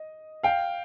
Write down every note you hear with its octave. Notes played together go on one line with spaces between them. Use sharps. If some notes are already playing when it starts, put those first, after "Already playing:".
Already playing: D#5
F5 G5